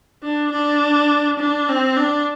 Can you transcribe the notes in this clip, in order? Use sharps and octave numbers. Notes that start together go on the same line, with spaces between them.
D4
D4
D4
C4
D4